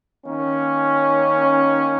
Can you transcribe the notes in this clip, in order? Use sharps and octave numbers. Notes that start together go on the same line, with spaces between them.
D#3 A#3 C#4